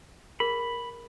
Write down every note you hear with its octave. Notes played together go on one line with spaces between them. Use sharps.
G#4 A#4 B5